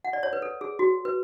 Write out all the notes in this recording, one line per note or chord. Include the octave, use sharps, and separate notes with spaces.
F#5
D5
C#5
B4
A4
G#4
F#4
B4